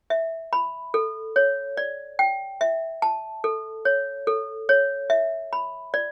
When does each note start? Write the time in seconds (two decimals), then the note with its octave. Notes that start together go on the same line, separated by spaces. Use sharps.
0.10 E5
0.53 B5
0.94 A4
1.36 C#5
1.77 D5
2.19 G5
2.61 E5
3.02 A5
3.44 A4
3.85 C#5
4.27 A4
4.69 C#5
5.10 E5
5.53 B5
5.94 D5